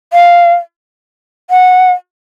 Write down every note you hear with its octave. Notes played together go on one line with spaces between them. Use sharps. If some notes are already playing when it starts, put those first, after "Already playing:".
F5
F#5